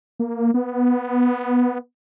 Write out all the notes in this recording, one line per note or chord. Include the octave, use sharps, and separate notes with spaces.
A#3
B3